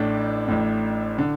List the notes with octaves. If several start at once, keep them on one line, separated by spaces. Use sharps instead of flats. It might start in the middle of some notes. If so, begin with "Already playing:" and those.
Already playing: A1 A2 D4
A1 A2
D3